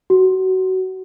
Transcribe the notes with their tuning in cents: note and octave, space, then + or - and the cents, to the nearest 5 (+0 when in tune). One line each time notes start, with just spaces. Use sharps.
F#4 +20